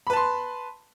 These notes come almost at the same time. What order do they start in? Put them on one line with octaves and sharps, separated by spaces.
B5 B4 A5 C6